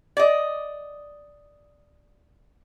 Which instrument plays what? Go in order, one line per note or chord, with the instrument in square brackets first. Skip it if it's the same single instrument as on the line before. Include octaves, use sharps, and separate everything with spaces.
[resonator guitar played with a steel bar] D5 D#5